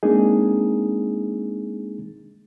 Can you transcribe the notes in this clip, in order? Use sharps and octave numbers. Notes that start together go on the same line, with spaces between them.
G#3 A#3 C4 D4 D#4 G#4